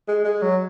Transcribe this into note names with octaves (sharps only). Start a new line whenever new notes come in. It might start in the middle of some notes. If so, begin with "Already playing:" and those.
G#3
G#3
F#3